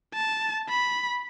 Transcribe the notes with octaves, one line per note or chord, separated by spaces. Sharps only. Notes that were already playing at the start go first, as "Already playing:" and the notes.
A5
B5